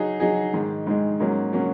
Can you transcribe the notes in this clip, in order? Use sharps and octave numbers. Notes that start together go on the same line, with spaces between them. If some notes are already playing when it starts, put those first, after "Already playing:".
Already playing: F#3 D#4 G#4
F#3 D#4 G#4
G#2 D#3 G#3
G#2 D#3 G#3
G#2 F#3 A#3 C#4
F#3 A#3 C#4